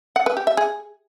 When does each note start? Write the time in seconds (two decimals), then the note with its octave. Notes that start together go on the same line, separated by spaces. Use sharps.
0.16 F#5
0.26 B4
0.37 G4
0.47 E5
0.57 G#4